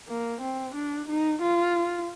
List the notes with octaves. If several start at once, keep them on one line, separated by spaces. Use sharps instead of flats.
A#3
C4
D4
D#4
F4